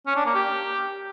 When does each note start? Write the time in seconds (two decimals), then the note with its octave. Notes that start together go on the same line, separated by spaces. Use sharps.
0.07 C#4
0.16 D4
0.26 A#3
0.35 G4